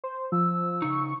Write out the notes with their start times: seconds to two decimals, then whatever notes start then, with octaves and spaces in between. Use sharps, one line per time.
0.04 C5
0.32 F3 E6
0.82 C#3 D#4 C#6